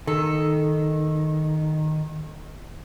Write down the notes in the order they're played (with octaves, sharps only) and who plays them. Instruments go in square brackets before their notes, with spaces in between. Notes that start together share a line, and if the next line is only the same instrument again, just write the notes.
[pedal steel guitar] D#3 [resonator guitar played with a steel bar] A4